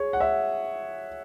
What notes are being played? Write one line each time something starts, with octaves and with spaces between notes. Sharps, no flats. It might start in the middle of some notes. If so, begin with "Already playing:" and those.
Already playing: G#4 C#5
F#5
E5